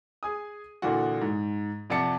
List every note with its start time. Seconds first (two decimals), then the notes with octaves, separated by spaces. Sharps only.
0.23 G#4 G#5 D#6
0.82 A#2 D3 E3 F4 F#4
1.21 G#2
1.90 F2 C3 D5 F#5 A5 C#7